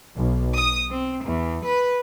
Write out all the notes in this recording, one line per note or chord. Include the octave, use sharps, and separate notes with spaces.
B1
D#6
C4
E2
B4